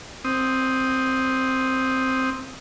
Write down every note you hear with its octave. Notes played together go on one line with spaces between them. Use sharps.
C4 D#6